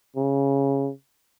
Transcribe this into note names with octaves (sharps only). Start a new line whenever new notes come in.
C#3